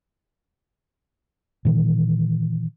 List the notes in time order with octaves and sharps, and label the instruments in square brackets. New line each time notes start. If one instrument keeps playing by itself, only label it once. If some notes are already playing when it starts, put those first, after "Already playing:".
[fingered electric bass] A#2 D#3 E3